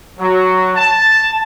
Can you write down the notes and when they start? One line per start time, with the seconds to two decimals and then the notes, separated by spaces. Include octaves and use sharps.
0.19 F#3
0.76 A5